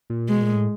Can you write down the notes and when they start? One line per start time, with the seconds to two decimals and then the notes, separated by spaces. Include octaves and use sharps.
0.10 A#2
0.28 B2 G#3
0.42 A#2
0.54 A2